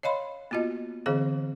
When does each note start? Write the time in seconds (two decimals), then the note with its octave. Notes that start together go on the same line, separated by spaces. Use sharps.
0.03 C#5 D#5 F5 B5 C6
0.51 A#3 B3 F4 F#4 D#5
1.06 D3 E3 C4 G#4 C5 F5